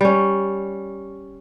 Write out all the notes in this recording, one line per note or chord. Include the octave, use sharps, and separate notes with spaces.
G3 C#4